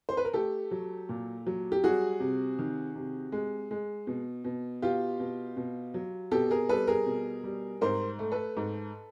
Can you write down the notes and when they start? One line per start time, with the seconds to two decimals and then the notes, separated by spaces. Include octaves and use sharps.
0.09 C5
0.17 B4
0.25 A#4
0.33 A3 G4 A4
0.71 F#3
1.09 A#2
1.47 F#3
1.72 G4
1.84 G3 F#4 G#4
2.20 C3
2.59 D#3
2.95 C3
3.32 G#3
3.71 G#3
4.07 B2
4.44 B2
4.82 B2 F4 G4
5.19 B2
5.57 B2
5.94 F#3
6.31 B2 G4 A4
6.51 G#4 A#4
6.69 G3 A4 B4
6.87 G#4 A#4
7.06 B2
7.44 G3
7.81 G#2 A#4 C5
8.19 A3
8.32 A4 B4
8.57 G#2